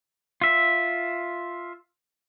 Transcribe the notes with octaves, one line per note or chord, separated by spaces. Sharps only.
F4 E5